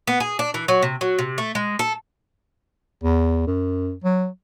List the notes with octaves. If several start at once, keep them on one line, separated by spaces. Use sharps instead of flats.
B3
G#4
D4
E3
F#3
C3
F#3
C3
A3
G#3
A4
E2
F#2
F#3